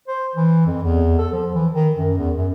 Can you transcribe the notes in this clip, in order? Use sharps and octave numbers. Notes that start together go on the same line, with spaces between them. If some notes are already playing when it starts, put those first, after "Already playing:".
C5
E3
F2
E2
A4
F3
E3
D#3
F#2
E2
F#2